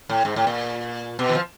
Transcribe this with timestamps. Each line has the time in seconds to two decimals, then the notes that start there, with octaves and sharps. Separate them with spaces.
0.09 A2
0.25 G#2
0.36 A2
0.47 A#2
1.19 B2
1.29 E3
1.35 F3